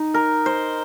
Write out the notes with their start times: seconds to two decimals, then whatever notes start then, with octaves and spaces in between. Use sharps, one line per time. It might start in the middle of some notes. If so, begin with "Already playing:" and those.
Already playing: D#4
0.14 A#4
0.46 C5